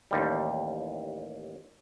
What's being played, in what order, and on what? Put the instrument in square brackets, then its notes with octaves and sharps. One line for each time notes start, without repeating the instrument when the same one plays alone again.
[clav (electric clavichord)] A1 D#2 G3